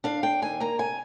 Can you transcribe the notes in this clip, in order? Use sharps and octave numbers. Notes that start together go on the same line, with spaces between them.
D4 F5
D4 G5
D#2 G#5
A#3 A#5
C3 G#5